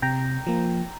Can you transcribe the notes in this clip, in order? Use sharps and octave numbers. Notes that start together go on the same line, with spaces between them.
C3 G5 A#5
F3 A#3